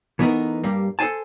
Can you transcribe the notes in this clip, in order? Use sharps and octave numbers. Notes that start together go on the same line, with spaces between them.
E3 A3 B3 D#4 A#4
G2 G3 A#3
A4 B4 C5 G#5 A5